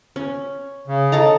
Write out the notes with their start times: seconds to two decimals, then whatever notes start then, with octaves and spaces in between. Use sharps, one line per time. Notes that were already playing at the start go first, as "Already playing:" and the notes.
0.16 C#4
0.87 C#3
1.12 A4 D#5 A5 A#5